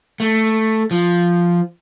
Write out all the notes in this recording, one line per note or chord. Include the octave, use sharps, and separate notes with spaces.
A3
F3